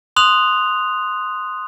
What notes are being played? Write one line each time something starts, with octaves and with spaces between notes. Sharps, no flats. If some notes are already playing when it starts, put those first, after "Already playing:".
C6 D#6 F#6 F7